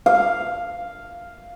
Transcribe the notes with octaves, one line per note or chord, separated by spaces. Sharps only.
F5